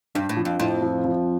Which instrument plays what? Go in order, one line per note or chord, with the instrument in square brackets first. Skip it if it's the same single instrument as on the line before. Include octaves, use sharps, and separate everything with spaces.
[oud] G2 [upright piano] D4
[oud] A2
[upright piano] F3
[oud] F2
[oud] F2 [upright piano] A2
[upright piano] F3
F3